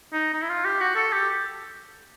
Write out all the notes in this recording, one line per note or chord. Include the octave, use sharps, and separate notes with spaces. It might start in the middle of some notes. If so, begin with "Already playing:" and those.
D#4
D#4
E4
F4
G4
F#4
A4
G4